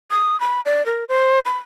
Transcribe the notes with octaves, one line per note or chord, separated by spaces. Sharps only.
D#6
B5
D5
A#4
C5
B5